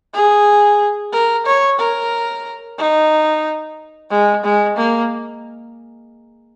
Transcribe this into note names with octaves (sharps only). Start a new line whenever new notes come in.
G#4
A#4
C#5
A#4
D#4
G#3
G#3
A#3